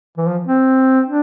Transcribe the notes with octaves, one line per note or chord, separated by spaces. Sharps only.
E3
F3
C4
D4